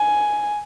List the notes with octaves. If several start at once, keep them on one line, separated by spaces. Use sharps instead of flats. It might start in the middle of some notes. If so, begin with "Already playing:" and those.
Already playing: G#5